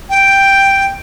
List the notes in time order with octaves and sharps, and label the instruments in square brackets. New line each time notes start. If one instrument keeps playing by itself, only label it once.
[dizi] G5